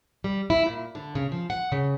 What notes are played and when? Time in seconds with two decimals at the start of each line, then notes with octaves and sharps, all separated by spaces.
0.24 G3
0.50 E4
0.66 A#2
0.95 D3
1.15 C#3
1.32 F3
1.50 F#5
1.72 C#3